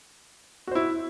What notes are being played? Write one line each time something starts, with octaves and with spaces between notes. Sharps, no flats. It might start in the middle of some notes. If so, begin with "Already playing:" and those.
E4 F#4 C5